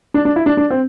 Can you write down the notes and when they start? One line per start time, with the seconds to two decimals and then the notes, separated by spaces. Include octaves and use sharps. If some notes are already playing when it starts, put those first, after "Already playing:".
0.14 D4
0.25 D4
0.36 E4
0.46 D4
0.57 D4
0.70 C4